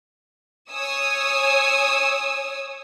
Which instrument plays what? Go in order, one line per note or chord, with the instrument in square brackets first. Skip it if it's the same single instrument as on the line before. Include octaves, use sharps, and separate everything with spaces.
[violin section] C#5 G#5 D#6 E6